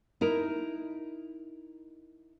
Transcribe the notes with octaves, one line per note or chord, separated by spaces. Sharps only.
D#4 E4 A#4